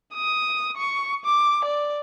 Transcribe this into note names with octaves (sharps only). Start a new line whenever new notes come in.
D#6
C#6
D6
D5